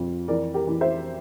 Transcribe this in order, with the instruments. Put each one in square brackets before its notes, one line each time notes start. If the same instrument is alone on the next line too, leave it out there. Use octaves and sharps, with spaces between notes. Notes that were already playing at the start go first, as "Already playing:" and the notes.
Already playing: [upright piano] F2 F4
E3 A#4 D5
G4 A#4
E3
C5 E5